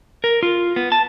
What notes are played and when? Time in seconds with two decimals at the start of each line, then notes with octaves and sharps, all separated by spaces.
0.24 A#4
0.43 F4
0.76 B3
0.92 A5